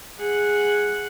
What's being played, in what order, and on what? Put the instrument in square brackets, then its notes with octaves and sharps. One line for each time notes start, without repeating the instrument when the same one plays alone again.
[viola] G#4 F#5